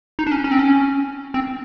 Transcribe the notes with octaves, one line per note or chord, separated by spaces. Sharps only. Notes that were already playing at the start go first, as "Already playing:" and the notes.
D#4
D4
C#4
C#4
C4
C#4
C4